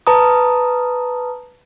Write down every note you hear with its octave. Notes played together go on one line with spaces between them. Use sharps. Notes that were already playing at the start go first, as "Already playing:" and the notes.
B4 A5 A#5 D#6